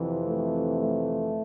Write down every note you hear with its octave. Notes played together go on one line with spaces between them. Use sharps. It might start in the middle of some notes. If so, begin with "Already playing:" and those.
Already playing: F2 C3 E3
A3
A3